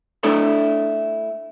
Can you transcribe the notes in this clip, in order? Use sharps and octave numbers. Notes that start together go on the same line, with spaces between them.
A3 D4 E4 A4 C#5 D5